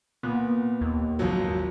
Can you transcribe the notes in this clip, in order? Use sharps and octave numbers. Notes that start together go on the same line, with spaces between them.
A#2 B3
D#2
G#1 F3 F#3